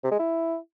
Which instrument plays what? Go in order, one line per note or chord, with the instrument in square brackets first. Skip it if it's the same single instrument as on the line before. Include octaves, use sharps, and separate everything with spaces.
[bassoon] C3
G#3
E4